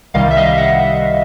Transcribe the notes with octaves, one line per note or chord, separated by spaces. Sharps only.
C2 C3 D#3 G3 D#5 F5
E5
D#5 F5
E5 F#5